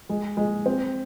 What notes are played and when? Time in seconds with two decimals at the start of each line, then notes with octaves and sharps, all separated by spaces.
0.09 G#3
0.37 G#3
0.66 C4